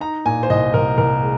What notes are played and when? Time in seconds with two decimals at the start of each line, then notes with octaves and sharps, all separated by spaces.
0.01 D#4 A#5
0.26 A#2 G#5
0.43 C5
0.50 C2 D#5
0.74 C2 A#4
0.98 C2 A#4
1.22 G#3